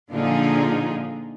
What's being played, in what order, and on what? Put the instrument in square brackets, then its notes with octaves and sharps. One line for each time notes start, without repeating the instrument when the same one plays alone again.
[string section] A#2 D3 F3 D#4 F4 G#4